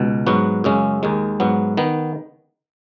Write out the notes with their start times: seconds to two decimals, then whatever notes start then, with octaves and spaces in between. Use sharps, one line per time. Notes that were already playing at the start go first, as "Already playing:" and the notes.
Already playing: C#2 B2
0.27 G#2 F#3 B3 F#4
0.64 F#2 C#3 G#3 C#4
1.03 D#2 D#3 G#3
1.40 G#2 F#3 B3
1.77 D#3 B3